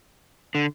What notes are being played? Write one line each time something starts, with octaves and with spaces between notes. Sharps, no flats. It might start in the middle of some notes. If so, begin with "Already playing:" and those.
D3